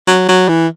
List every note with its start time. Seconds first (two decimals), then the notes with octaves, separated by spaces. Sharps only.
0.08 F#3
0.29 F#3
0.48 E3